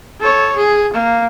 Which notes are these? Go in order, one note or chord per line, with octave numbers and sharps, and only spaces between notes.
A4 C#5
G#4
A#3